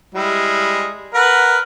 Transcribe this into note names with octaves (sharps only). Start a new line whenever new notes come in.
G3 G#3 E4
A#4 B4 F#5